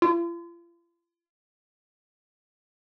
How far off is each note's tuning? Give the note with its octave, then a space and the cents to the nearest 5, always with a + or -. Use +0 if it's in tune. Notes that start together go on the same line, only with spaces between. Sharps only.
F4 -40